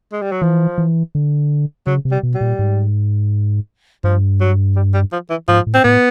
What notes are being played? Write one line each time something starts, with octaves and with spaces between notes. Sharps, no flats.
G#3
G3
F#3
E3 F3
E3
D3
C#3 F#3
C3
G3
B2
G3
A#2
G#2
G2 F3
F#3
G3
G3
F3
E3
G#2 F3
A2
C4
A2 B3